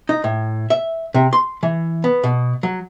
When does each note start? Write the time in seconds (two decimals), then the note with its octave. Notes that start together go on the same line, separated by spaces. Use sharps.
0.09 D#4
0.24 A2
0.70 E5
1.14 C3
1.33 C6
1.63 E3
2.04 B3
2.24 B2
2.63 F#3